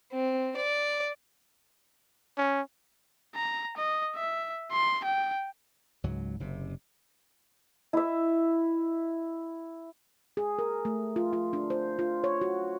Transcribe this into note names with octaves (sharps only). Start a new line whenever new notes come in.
C4
D5
C#4
A#5
D#5
E5
C6
G5
C#2 G#2 F#3
F#1 C3
E4 E5
G#4
A#4
A3
F4
F4
D4
C5
F4
C#5
F#4